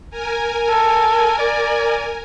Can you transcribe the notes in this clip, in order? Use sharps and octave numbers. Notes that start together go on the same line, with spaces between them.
A#4 G#5
A4
D5